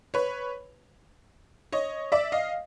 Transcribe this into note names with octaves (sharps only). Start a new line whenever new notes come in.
B4 C#5
C#5 D#5
D5 E5
D#5 F5